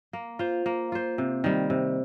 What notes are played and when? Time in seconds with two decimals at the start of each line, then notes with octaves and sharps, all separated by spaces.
0.13 A#3
0.39 F4 C5
0.66 A#3
0.92 F4 C5
1.18 C3
1.44 D#3 G3
1.70 C3